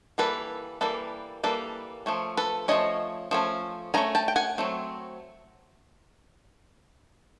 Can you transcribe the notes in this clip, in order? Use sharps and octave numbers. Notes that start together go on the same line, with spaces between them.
E3 G3 A#3 A4 B4
E3 G3 A#3 A4 B4
E3 G3 A#3 A4 B4
F3 A3 C#4
A4 B4
F3 A3 C#4 C#5 D#5
F3 A3 C#4
F3 A3 C#4 G#5 A#5
G5 A5
G5
F#5 G#5
F#3 A3 C4